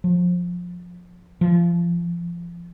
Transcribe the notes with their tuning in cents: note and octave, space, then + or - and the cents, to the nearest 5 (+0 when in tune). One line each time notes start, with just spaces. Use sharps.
F3 +20
F3 -25